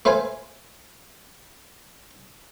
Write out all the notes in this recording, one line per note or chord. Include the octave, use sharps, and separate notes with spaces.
A3 B4 C5 F5 G#5